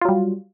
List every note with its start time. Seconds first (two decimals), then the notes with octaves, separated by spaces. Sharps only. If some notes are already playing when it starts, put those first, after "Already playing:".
0.01 F4
0.05 F#3
0.09 G3